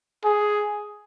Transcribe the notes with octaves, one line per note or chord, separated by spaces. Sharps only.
G#4